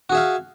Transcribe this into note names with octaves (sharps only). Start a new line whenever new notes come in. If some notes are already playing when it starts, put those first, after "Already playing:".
F#4 G#4 E5 F5